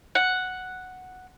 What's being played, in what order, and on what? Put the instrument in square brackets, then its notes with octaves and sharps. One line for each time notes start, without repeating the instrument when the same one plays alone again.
[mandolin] F#5